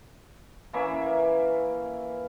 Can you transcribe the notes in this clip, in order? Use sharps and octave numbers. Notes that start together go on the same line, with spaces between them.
E3 A#3 C#4 E5